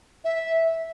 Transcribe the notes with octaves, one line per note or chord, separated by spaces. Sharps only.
E5